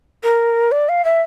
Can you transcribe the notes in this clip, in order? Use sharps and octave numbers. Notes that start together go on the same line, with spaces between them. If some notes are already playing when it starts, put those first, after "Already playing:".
A#4
D5
F5
E5